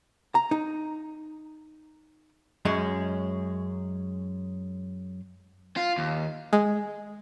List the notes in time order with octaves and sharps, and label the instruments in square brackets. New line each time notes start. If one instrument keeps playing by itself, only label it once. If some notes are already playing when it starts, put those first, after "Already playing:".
[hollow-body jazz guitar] A#5
D#4
F#2 G#3 C#4
[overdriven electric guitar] F4
D#2
[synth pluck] G#3